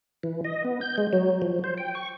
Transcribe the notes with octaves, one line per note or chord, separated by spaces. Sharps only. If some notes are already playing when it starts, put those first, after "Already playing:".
E3
D#5
B3
G6
G#3
F#3
F3
C5
G5
C#6